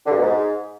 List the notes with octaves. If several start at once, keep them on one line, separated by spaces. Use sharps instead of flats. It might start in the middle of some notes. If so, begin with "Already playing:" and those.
D3
G2
B2
G#2